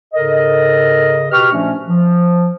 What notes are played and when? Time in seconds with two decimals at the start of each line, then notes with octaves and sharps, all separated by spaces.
0.14 G#2 C#3 A4 A#4 D#5
1.32 B2 G4 B4 C#6 F6
1.52 A#2 F3 A3 C#4 D4
1.88 F3